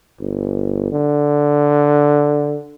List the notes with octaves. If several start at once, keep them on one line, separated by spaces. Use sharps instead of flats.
G1
D3